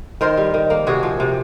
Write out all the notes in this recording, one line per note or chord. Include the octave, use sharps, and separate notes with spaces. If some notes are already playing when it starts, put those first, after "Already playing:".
D#3 A#4 C5
G3
D#3
A#3
C3 F#4 G#4
F3
C3